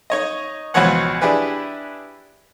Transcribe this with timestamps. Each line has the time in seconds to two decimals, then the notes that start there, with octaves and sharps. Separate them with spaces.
0.10 D#4 C#5 D#5
0.74 C#2 B2 E3 F3 C#5 F#5
1.21 D4 E4 G4 G#4 B4